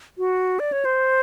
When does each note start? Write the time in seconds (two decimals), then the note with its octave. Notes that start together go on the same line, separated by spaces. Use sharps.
0.18 F#4
0.59 D5
0.72 C#5
0.85 C5